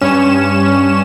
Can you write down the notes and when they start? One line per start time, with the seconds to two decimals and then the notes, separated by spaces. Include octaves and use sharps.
0.01 G2 C#4 E7